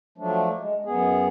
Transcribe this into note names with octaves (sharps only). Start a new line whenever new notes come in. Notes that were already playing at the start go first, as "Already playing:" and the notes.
F3 F#3 A3 D4
G#3
F#2 B3 G#4